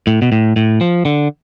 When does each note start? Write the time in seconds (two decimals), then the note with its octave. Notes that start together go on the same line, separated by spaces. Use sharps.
0.07 A2
0.22 B2
0.32 A2
0.56 A2
0.81 F3
1.05 D3